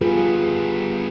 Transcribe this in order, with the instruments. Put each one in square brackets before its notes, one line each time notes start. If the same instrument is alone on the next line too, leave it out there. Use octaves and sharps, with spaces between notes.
[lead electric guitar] G3 B3 [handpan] F4 G#4 B4